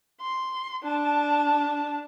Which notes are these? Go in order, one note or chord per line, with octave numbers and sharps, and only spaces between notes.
C6
D4 A5